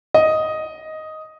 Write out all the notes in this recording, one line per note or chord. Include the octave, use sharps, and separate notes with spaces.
D#5